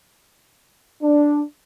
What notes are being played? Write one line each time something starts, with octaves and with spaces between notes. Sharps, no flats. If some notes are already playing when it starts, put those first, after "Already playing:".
D4